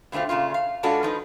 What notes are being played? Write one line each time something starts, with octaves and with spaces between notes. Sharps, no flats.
B2 D3 A3 C4 F4
A#2 C#3 A3 F4
F5
B2 G#3 D4 F4 F#4 A4
F3 D#4 B4